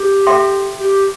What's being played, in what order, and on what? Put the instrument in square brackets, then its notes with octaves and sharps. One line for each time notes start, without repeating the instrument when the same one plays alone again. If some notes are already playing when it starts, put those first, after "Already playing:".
Already playing: [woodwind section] G4
[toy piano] A4 E5 G5 C6
[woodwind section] G4